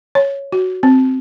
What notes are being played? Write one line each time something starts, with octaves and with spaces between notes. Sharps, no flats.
C#5
F#4
C4